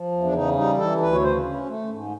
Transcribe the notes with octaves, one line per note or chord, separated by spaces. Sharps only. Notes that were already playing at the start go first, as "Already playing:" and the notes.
Already playing: F3
E2
D4
C#3 D#4
G3 D#4
E3 A4
D2 B4
C#5
C#3 C5
C#4
A3
G#2